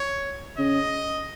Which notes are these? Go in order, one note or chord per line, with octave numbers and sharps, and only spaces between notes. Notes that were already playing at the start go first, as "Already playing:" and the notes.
Already playing: C#5
C#3 D#5